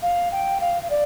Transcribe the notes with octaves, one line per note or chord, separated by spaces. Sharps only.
F5
G5
F5
F5
D5